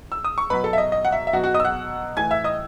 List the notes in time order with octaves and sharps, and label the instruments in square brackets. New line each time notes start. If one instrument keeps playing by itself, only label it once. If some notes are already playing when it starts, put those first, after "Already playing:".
[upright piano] E6
D#6
C#6
B2 F#3 B4 B5
A4 A5
E5
D#5
D#5
F#5
E5
E5
B2 F#3 F#4 F#5
F#4 F#5
D#5 D#6
E6
F#5 F#6
A2 E3 G#5 G#6
E5 E6
D#5 D#6